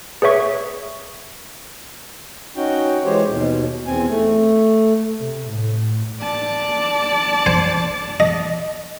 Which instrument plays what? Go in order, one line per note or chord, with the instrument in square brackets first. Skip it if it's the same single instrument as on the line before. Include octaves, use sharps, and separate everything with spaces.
[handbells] G#4 B4 C#5 E5 C#6
[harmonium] C#4 D#4 F#4 G5
E3 G#3 G4 C5 C#5
D#2 B2
E2 C4 G#5
A3
[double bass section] C3
A2
[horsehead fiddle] D5 A5
[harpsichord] C5 G#5
D#5